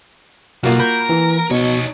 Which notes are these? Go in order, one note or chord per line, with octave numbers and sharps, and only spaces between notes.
B1 A#3 F4 F#4
A#4 B5 G6
E3
B2 D#4 C#5